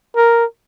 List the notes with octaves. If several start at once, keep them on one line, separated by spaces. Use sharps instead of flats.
A#4